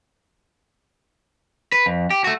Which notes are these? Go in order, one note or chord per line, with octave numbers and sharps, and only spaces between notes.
B4
F2
G4
A3 F#4